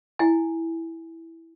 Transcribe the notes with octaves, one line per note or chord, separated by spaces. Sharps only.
E4 G#5